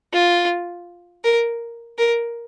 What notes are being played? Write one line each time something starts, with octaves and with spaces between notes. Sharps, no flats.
F4
A#4
A#4